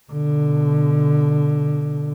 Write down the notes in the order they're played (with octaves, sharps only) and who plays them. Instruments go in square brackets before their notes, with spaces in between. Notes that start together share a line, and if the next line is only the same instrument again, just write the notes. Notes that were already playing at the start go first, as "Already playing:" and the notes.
[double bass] B2 D3